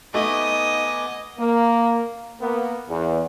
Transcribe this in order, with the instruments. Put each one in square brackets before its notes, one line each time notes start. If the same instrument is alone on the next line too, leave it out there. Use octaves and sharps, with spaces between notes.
[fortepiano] A3 [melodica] B3 G#5 D6 [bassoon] D#4 [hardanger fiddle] D#5
[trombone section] A#3
A#3 B3 A#4
E2